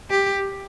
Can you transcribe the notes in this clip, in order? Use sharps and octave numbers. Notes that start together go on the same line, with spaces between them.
G4